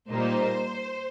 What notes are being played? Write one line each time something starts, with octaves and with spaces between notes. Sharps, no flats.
A#2 G3 A#3 D#4 C5